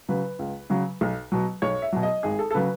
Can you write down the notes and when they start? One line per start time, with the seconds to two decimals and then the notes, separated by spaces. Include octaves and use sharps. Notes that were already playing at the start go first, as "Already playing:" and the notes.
0.09 C#3 F#3 B4
0.39 C#2
0.70 C#3 F#3
1.01 B1
1.32 B2 F#3
1.62 B1 C#5
1.82 E5
1.92 B2 F#3
2.03 D#5
2.23 G#1 G#4
2.39 A4
2.51 A4
2.54 C#3 F#3 B4